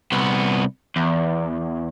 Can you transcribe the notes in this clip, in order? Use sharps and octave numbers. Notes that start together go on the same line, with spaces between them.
C2 B3
E2